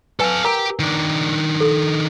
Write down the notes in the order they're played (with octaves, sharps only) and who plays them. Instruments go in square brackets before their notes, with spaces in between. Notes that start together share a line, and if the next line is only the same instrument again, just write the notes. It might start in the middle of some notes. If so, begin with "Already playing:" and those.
[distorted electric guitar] A4 F5 [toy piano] B4 F#5 G#5
[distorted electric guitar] G4 [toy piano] A#4 F#5 A#5
[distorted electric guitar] D#3 D4
[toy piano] A4